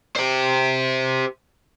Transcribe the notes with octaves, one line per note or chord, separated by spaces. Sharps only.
G4 C5